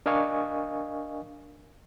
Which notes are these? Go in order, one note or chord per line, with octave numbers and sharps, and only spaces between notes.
D4 A#4 D#5 F5 G#5 C#6